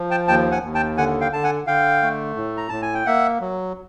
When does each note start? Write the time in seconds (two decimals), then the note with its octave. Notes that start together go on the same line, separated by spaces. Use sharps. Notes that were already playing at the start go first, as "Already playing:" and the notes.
Already playing: F3
0.11 G5 A5
0.28 D#2 G5 A5
0.51 F#5 G#5
0.63 D#2
0.75 G5 A5
0.98 D3 F#5 G#5
1.21 F5 G5
1.32 D3 A5
1.44 F#5 G#5
1.67 D3 F5 G5
2.02 A3
2.37 A2
2.57 A#5
2.69 A2 A5
2.82 G#5
2.94 G5
3.06 A#3 E5 F#5
3.41 F#3